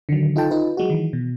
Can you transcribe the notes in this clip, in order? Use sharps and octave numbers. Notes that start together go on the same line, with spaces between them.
D3 D#3 F#3
D#4 F4 A4 G5 A5
D#4 F4 B4
F#3 G#3 F#4
D#3 E3
B2